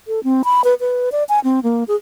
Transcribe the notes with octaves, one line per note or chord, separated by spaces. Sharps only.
A4
C4
B5
B4
B4
D5
G#5
C4
A#3
G#4